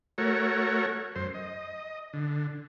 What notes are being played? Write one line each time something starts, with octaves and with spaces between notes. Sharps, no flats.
A3 F#4 A#4 C#5
F#2 C5
D#5
D3